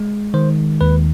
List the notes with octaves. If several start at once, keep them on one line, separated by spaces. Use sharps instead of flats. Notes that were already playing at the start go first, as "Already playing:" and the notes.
Already playing: G#3
D#3 C5
D#2 B4